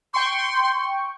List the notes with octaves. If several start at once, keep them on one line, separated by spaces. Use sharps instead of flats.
G5 C6 C#6